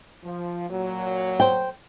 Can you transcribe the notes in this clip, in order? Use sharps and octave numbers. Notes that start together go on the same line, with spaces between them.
F3
A#2 F#3
C5 G5